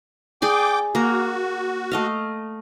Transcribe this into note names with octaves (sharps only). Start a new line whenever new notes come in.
G#4 D5 G5 G#5 D6
A#3 F#4 A#5
A3 D#5 F5